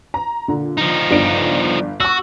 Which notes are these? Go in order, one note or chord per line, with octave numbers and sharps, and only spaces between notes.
A#5
A#2 D3
F3 D#4
G1 D4 D7
F#4 C#6 E6